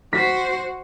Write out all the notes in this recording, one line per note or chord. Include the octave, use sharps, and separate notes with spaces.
F#4 C5 B6